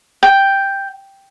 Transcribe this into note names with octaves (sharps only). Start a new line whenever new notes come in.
G5